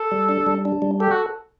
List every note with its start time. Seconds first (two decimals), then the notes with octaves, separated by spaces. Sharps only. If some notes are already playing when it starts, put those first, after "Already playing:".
Already playing: A4
0.12 G3
0.29 D4
0.47 G3
0.65 D4
0.82 G3
1.00 G4 A4
1.11 F#4